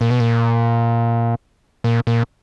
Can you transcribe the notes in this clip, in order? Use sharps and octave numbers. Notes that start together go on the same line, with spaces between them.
A#2
B2
A#2
A#2
A#2